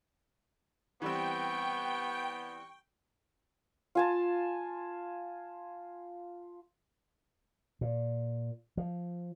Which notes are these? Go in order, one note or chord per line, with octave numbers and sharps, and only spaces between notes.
E3 G3 B3 C4 G5 C#6
F4 G#5 A5
A#2
F3